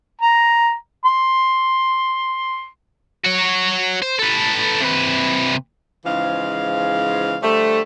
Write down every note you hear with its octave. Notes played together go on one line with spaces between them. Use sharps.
A#5
C6
F#4 C#5
C5
A4 B4
C3 B4
G#2 C#3 E3 F3 G#3 F5
D3 F3 G3 A3